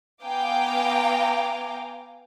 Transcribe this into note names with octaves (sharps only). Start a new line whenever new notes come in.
B3 F5 G5 G#5 A#5 D6